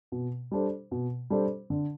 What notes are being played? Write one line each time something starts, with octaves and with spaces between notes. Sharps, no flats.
B2
G3 D4 A4 C5
B2
G3 D4 A4 C5
D3